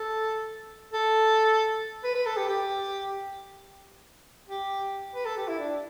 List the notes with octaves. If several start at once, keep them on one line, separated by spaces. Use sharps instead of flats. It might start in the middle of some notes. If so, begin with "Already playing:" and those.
Already playing: A4
A4
B4
B4
A4
G4
G4
G4
B4
A4
G4
E4
D4